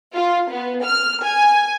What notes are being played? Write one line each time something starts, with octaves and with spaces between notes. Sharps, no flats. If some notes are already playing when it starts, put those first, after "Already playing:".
F4
B3
F6
G#5